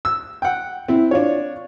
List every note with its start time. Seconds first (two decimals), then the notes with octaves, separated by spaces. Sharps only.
0.05 E6
0.42 F#5 G5
0.88 C4 E4
1.11 D4 F4 C#5